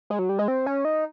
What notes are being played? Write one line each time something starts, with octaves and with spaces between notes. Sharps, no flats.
G#3
F#3
G3
G#3
C4
C#4
D#4